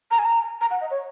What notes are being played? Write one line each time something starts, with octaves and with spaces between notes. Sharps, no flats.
A#5
G#5
A#5
A#5
F#5
D#5
C#5